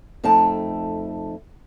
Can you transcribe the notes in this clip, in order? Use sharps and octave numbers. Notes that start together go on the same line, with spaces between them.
F2 A3 D#4 G5 A5